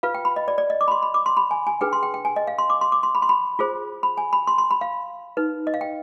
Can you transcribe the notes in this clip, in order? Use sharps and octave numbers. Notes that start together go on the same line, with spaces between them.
F4 B4 F5
G5
B5
D#5
D5
D5
D#5
D6
B5
C6
B5
D6
C6
B5
G#5
G#5
D4 G#4 B4 G5
C6
G5
G5
G#5
D#5
F5
C6
D6
C6
D6
C6
B5
C6
B5
F4 G#4 C5
B5
G#5
B5
C6
C6
B5
F5
D#4 B4
D#5
F5
G5